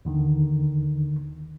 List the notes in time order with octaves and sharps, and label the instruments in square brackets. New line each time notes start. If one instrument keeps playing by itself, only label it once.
[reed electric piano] D#2 D3 D#3